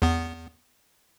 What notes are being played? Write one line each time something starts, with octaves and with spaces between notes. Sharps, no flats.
E2 B3